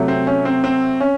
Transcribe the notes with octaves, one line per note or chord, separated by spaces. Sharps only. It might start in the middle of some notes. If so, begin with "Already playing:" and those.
Already playing: C3 F#3 A3
C4
C#4
C4
C4
C#4